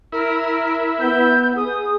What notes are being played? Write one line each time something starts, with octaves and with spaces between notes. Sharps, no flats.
E4 A#4
B3 G6
G#4 D#6